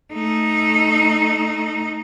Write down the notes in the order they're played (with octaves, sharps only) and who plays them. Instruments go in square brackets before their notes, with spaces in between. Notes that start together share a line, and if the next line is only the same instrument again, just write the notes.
[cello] A3 D#4